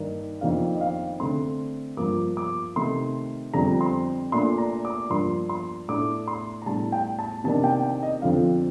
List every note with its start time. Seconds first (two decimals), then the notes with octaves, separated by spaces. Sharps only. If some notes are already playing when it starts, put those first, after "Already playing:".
Already playing: G2 D#3 A#3 D4
0.41 F2 D#3 A#3 D4 F5
0.75 D#5
0.81 F5
1.19 D3 A3 C4 C6
1.97 G2 F3 A#3 D6
2.37 D6
2.76 C3 D#3 A3 C6
3.53 F2 D3 G3 C4 A#5
3.81 C6
4.32 A#2 A3 D4 C6
4.58 A#5
4.85 D6
5.10 G2 F3 A#3 D4 C6
5.49 C6
5.88 A2 A3 D4 D6
6.28 C6
6.62 A#5
6.66 A2 G3 D4 A5
6.92 G5
7.19 A5
7.44 C3 D#3 A#3 D4 A5
7.64 G5
7.83 G5
8.03 D#5
8.22 F2 D3 F3 C4 F5